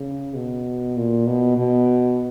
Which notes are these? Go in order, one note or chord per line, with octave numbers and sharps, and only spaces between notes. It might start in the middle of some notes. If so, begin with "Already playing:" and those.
Already playing: C#3
B2
A#2
B2
B2